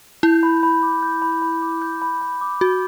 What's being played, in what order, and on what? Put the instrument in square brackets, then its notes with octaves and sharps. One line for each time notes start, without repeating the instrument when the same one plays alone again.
[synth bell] E4 [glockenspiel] G6
[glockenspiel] B5
B5
D6
G6
B5
B5
D6
G6
B5
B5
D6
[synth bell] F#4 [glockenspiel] G6